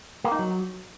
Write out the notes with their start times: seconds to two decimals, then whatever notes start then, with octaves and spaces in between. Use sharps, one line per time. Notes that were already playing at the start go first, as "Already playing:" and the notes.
0.24 A#3
0.32 D#4
0.39 F#3